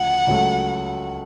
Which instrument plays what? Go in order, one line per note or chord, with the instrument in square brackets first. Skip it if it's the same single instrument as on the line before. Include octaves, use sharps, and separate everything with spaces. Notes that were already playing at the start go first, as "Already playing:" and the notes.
Already playing: [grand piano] D2 C#3 F3 [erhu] F#5
[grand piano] C#2 C#3 F#3 A3